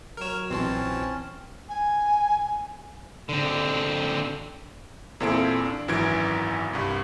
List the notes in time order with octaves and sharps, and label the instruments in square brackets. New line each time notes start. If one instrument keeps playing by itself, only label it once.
[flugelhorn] F#3 [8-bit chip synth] A#4 C#5 [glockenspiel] F6 E7
[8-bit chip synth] A#1 E3 A5 [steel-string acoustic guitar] C4 C#4
[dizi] G#5
[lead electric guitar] D3 C4
[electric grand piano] E2 A#2 C4 E4 A4 D7
D4
G#1 F#2 E3 G#6 D7
C2 G2